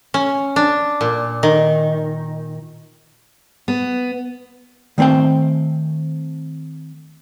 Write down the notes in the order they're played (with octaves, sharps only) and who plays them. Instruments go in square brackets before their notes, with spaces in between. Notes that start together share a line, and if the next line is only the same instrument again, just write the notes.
[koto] C#4
D4
A#2
D#3
[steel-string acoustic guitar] B3
[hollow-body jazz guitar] D#3 A3 C4 C5 G5